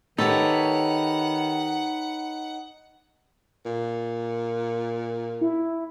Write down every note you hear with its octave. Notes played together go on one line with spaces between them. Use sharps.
D#3 D#4 G4 A4 B4 C#5 F#5
A#2
E4